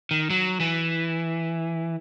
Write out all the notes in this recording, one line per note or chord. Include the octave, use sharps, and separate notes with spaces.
D#3
F#3
E3